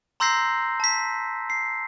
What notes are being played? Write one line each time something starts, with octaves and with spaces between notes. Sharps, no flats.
A#5 C6 E6 G6 A#6 C7
A5 B6
C7